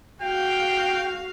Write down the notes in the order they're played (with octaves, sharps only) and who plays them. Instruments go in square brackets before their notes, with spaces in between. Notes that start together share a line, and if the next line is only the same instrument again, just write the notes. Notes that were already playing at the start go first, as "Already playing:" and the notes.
[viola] F#4 F5 [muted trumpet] G5